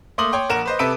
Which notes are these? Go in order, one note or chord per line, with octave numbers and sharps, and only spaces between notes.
A3 A#3 C6 D6 D#6 F#7
C#5 G5 C6
A#1 A#4 F#5 E7
B4 C5 D#5
C3 A4 B4 E5 D7 D#7